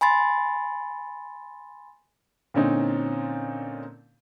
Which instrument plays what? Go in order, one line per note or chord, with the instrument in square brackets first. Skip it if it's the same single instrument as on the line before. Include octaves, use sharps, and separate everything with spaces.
[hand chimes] G#5 B5 C6 A6
[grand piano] A#2 D3 C4 C#4 D#4